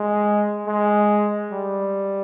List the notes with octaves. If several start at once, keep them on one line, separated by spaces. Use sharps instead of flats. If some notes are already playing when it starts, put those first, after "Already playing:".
Already playing: G#3
G#3
G3